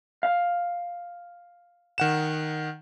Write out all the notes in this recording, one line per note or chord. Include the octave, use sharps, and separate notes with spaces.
F5
D#3 F#5 E7